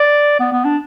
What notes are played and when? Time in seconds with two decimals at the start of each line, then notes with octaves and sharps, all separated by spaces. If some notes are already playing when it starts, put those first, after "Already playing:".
Already playing: D5
0.40 B3
0.53 B3
0.65 D4